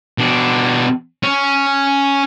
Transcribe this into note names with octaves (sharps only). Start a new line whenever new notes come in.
B2 D4
C#4